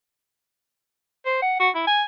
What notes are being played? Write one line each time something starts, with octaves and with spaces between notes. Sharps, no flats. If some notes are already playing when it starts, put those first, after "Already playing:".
C5
F#5
F#4
E4
G#5